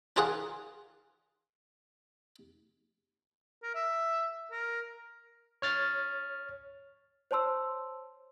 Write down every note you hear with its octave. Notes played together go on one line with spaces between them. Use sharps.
D4 F4 G#4 A#4 F#5
A#4
E5
A#4
C#5 F6 A6
C5 C#5 A5 C6 E6